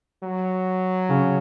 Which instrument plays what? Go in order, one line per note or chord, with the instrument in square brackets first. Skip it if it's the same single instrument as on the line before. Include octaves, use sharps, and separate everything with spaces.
[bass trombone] F#3
[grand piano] C#3 C#4